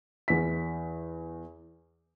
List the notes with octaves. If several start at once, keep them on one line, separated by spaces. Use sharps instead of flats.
E2 B6